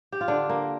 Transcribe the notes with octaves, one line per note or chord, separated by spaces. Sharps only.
G4
F4
D3 D4
A#3